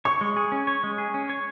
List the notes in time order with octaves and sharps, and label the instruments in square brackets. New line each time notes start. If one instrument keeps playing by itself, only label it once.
[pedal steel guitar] C#5 [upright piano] C#6
[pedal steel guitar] G#3
G#4
C#4
C#5
G#3
G#4
C#4
C#5